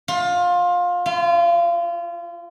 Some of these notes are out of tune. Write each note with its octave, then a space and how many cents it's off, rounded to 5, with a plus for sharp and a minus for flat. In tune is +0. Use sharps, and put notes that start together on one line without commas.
F4 +20
F4 -30